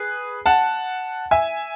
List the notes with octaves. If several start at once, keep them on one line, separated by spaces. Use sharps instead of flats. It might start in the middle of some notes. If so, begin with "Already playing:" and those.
Already playing: G#4 B4
F#5 A5
E5 G#5